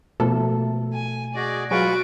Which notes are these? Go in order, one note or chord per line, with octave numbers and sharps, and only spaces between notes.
B2 F3 A3 A#3 A4
G#5
F#4 G#4 D5 D#5
F#3 G#3 F4 F#4 B4 C#6 D7